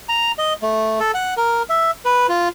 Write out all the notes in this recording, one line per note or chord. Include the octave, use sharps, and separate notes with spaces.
A#5
D#5
A3
A4
F#5
A#4
E5
B4
F4